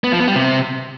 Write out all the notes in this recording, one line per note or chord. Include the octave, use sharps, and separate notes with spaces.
B3
F3
B3
G3
C3